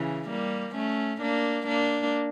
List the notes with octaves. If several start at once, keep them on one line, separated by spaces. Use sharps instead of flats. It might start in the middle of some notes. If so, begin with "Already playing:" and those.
Already playing: C#3 E3
G3 A#3
A3 C#4
A#3 D4
A#3 D4